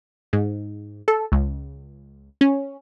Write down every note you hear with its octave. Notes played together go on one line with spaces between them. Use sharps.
G#2
A4
C#2
C#4